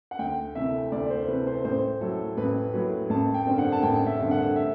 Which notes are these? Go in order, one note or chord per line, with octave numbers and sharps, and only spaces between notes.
F#5
D2 G5
C3 E3 A3 E5
D2 D5
C5
C3 E3 A3 B4
C5
A1 C5
A2 F#3 A4
A1 B4
A2 F#3 B4
A1 A5
G5
G2 D3 G3 C4
F#5
A5
A1 G5
E5
G2 D3 G3 C4
F#5
E5